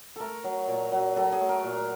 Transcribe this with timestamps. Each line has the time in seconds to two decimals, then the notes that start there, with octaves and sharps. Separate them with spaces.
0.16 A3 A4 A#4
0.44 F#3
0.68 A#2
0.92 F#3
1.16 F#3 A4
1.32 G#4
1.41 A3
1.49 A#4
1.64 A#2